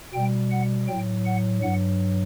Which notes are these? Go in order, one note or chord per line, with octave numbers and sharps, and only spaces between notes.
B2 G3 G5
F#5
F#3 G5
A2
F#5
G2 F#3 F#5